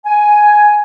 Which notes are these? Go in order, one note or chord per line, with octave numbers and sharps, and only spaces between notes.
G#5